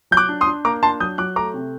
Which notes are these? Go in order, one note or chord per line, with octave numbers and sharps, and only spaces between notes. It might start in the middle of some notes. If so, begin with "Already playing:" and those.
F#3 G6
D6 F#6
D4
C6 D#6
D4
A#3 A#5 D6
D4 A5 C6
F#3 D#6 G6
F#3 D6 F#6
A3 A#5 D6
C3